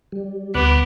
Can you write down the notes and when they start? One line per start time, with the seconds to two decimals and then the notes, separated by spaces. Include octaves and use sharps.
0.12 G3
0.54 D2 B3 D6 F#6